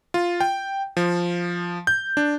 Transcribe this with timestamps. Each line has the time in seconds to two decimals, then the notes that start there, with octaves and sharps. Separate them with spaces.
0.14 F4
0.40 G5
0.97 F3
1.87 G6
2.17 D4